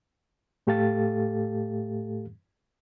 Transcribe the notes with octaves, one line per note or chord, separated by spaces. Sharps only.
A2 A3 G4 A4 F5 A6